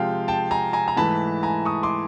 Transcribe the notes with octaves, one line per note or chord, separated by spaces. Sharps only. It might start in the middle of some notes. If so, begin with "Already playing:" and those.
Already playing: C3 F3 G#3 F5 G5
G5 A5
G#5 A#5
G#5 A#5
A#5
G#2 E3 A3 A5 B5
G#5 A#5
C#6 D#6
C6 D6